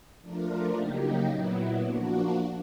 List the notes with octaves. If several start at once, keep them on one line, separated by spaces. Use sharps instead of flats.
F3 A3 D4 F4 A#4
C#3 F#3 A#3 D#4 G4
A#2 F#3 B3 E4
F3 A#3 D4 F#4